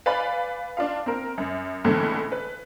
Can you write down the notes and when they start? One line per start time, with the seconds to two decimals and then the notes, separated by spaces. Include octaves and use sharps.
0.06 B4 D5 F5 G#5 B5
0.77 D4 F4 F5
1.06 C4 A#4
1.38 F#2
1.84 C#2 A2 D3 E3 C4
2.32 B4